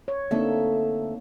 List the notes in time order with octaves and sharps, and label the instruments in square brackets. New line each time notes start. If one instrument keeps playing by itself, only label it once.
[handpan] C#5
[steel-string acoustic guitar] D2 A4 E5 [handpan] A#3 C4 D#4